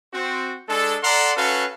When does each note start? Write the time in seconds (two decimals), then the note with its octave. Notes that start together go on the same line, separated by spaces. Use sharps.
0.13 C4 F#4
0.68 G#3 D4 A4
1.03 A4 D5 F#5 A#5 C6
1.36 C#4 F#4 A4 B4 F5